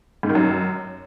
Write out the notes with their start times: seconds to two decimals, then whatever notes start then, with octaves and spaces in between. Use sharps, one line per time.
0.23 G#2
0.29 D#3
0.35 F#2